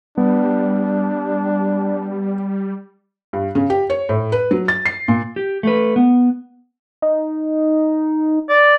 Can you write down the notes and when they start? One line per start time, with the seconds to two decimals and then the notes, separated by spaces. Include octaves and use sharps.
0.18 G3 B3 D4
3.33 G2
3.55 C#3
3.70 G4
3.90 C#5
4.09 A2
4.32 B4
4.51 F#3
4.68 A6
4.86 C7
5.08 A#2
5.36 G4
5.63 A3 B4
5.96 B3
7.02 D#4
8.49 D5